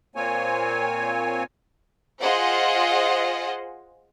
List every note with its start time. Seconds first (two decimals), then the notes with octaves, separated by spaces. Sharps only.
0.16 A#2 A#3 C4 C#5 G#5
2.21 F4 G#4 C5 D#5 F#5